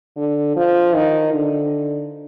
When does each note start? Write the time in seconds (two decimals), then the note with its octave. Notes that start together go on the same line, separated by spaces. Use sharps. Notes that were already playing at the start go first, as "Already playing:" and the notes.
0.17 D3
0.56 F3
0.95 D#3
1.34 D3